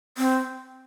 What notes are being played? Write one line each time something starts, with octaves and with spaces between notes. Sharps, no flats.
C4